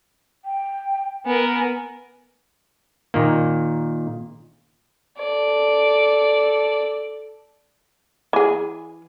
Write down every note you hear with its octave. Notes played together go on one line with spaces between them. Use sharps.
G5
B3 A#4 G#5
A#2 D#3 A#3
A4 D5
E3 G#4